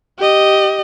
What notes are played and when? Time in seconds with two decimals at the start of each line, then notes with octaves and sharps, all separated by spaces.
0.18 G4 D#5